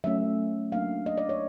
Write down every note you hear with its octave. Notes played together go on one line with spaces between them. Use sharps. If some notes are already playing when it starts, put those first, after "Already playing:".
F#3 A3 C#4 E5
F#3 A#3 D4 F5
D#5
D5
C#5